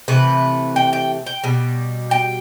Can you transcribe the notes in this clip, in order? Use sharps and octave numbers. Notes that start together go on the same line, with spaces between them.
C3 E3 A3 B4
G5
G5
G5
B2 G3
G5